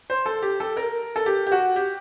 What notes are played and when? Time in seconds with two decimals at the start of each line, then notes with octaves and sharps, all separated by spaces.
0.10 C5
0.26 A4
0.42 G4
0.60 A4
0.77 A#4
1.16 A4
1.26 G4
1.47 G4
1.52 F#4
1.76 G4